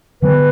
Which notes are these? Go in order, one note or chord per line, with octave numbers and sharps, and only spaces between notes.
D3 F#3 B3 B4